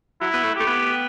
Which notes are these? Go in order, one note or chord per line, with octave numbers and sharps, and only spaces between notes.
F#3 E4
B3
A3
A3 G4
B3